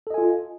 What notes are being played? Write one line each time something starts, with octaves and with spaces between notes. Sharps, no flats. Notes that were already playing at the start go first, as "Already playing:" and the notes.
F4 A4 D#5 G#5